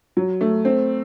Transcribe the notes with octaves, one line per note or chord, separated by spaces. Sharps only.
F#3
A3
C4